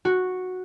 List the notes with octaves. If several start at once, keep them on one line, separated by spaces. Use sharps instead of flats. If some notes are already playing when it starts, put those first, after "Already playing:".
F#4